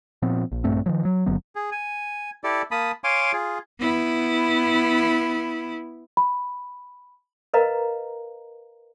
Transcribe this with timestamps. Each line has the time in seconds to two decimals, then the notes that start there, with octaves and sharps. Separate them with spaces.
0.22 A#2 F3 B3 C4
0.52 A#1
0.64 A#1 G2 A3 C4
0.86 D#3 F3 F#3
1.05 F#3
1.26 F#1 D3 F#3 B3
1.55 G#4
1.72 G#5
2.44 E4 G4 A4 D5
2.71 A#3 A5 B5 D#6
3.04 C#5 F5 G#5 C6 D6
3.33 F4 G#4
3.79 B3 E4
6.17 B5
7.54 A#4 B4 D#5 F5 A#5